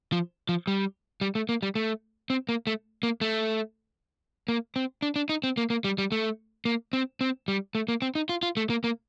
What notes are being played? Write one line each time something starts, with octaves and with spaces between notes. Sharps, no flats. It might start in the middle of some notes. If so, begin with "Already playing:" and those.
F3
F3
G3
G3
A3
A#3
G3
A3
C4
A#3
A3
A#3
A3
A#3
C4
D4
D4
D#4
C4
A#3
A#3
G3
G3
A3
A#3
C4
C4
G3
A3
A#3
C4
D#4
F4
F4
A3
A#3
A#3